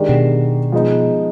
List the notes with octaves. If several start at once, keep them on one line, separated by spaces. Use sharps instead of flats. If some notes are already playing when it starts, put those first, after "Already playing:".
Already playing: D#3 G#3 D4 G4 D5
B2
F3 G#3 B3 D#4